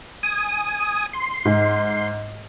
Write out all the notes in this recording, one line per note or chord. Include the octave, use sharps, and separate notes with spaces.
G#5 D#6
C6
G#2